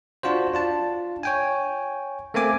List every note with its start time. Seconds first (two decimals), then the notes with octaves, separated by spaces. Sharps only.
0.23 D4 F4 F#4 C5
0.54 D4 F4 A5
1.23 C#5 G5 G#5
2.34 A3 A#3 C4 G#5 D6